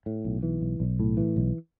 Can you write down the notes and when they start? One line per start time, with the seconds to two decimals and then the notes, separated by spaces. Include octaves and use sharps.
0.06 A2
0.25 B1
0.43 E3
0.61 B1
0.80 B1
1.00 A2
1.17 E3
1.36 B1